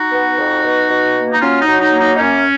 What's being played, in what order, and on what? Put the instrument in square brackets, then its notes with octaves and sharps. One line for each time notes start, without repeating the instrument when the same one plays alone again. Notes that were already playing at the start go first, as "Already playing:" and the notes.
Already playing: [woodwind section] D#4 F#4
B3
F2
B2
B2
A#3
D#4
F#3 C#4 F4
D#4
F#3
D#4
A#3
D#4
D#4
F#2 C#4